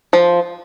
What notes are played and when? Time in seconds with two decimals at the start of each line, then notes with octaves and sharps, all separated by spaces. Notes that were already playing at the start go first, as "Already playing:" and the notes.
0.13 F3